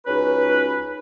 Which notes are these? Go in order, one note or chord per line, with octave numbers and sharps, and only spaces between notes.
C#2 C#4 D#4 F#4 B4